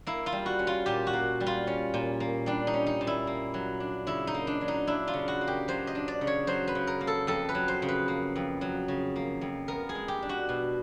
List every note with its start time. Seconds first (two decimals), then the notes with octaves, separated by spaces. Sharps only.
0.07 A#3 E4
0.26 F4
0.32 G3
0.46 F#4
0.59 C#4
0.67 F4
0.86 A#2 G4
1.07 F#4
1.13 A#3
1.40 G3
1.46 F4
1.67 C#4
1.94 A#2
2.20 A#3
2.46 G3 D4
2.67 D#4
2.74 C#4
2.86 D#4
3.01 A#2
3.07 E4
3.27 A#3
3.54 F#3
3.80 D4
4.07 C#3 E4
4.27 D#4
4.34 A#3
4.47 D4
4.61 F#3
4.68 D#4
4.87 D4 E4
5.08 F4
5.14 C#3
5.28 F#4
5.41 A#3
5.48 G4
5.68 F#3 C5
5.87 D#5
5.95 D4
6.08 D5
6.21 C#3
6.27 C#5
6.47 F#3 C5
6.67 B4
6.75 C#3
6.87 A#4
7.01 A#3
7.07 A4
7.27 F2 A4
7.49 B4
7.55 F#3
7.68 C5
7.82 C#3
7.88 B4
8.08 A#3
8.36 F2
8.61 F#3
8.88 C#3
9.16 A#3
9.41 F2
9.68 B3 A#4
9.89 G#4
9.95 G#3
10.08 G4
10.22 D4
10.29 F#4
10.49 B2